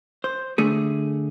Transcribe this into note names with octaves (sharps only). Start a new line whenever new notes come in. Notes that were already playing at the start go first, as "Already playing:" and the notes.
C5
D3 A3 G#4